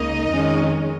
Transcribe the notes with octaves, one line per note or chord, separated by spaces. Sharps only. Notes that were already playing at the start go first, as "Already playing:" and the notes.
Already playing: C#2 C#3 A#3 D#4 D#5
F2 D#3 G#3 C#4